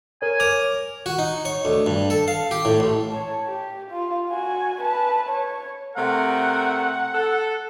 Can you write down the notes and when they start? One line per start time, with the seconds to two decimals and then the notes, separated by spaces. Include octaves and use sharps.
0.22 A#4 C#5 G#5
0.40 A#4 C#5 A#5 D6
1.06 F#4
1.19 D#4
1.45 C#5
1.65 D2
1.86 G2
2.10 A4
2.28 F5
2.51 G4
2.65 A2
2.80 A1
3.10 C#5 A5
3.46 G4
3.90 F4
4.29 F#4 G#5
4.81 B4 A5
5.29 C#5
5.96 C3 A3 A#4 F#5
7.14 A4